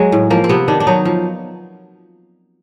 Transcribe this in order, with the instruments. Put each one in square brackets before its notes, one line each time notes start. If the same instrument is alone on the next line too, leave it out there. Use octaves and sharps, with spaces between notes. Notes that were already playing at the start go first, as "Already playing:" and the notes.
Already playing: [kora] F#3 G#3
A2
F3 A#3
C4
C3 B3
D#3 D4
D4
F#3 D#4
F3